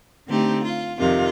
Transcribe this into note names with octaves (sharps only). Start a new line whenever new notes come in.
D3 A3 C4 D#4 G4
F4
F2 C3 D#3 F4